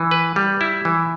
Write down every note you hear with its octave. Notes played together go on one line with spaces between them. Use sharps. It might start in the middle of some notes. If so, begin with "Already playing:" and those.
Already playing: E3
B4
G3
E4
E3